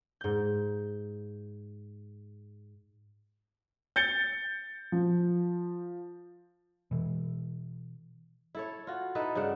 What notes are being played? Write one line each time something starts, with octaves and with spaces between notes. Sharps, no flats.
G#2 G6
G6 A6 C#7 G7
F3
B2 E3
E4 A4 C#5
F4 F#4
D#4 E4 A4 B4
G2 C#3 D4 F#5